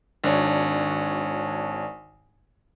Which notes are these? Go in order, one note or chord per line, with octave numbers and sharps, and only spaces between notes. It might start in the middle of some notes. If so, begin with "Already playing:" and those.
G#1 D4 C#5